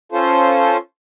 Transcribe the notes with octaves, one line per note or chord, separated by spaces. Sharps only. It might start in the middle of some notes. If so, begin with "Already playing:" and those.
C#4 F4 A4 C5